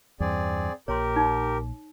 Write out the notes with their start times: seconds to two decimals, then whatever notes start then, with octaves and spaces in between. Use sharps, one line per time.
0.20 E2 G2 C4 G#4 D5
0.88 A#1 A#2 G4 A#4 C#5 C6
1.16 D#4